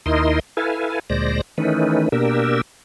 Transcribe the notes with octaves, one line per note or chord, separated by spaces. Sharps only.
D#2 D#4 E4 A#4 D#5 C6
E4 A4 B4 F5 G#5
D2 A#2 G#3 C5 D5 A#6
D#3 E3 A3 C#4 D#4 B4
B2 A#3 D4 G4 A#4 E6